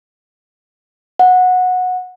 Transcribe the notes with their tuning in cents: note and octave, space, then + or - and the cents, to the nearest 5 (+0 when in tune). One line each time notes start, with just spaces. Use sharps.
F#5 -15